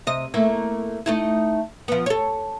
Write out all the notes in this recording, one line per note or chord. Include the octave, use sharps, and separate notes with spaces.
C3 D#5
A3 A#3 E4
A3 D#4 E4
F3 B3
A4 C#5